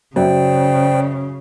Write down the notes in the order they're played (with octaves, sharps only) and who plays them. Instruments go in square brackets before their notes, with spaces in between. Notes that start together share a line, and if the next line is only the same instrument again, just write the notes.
[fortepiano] F#2 [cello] C#3 [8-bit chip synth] C5 D5 G5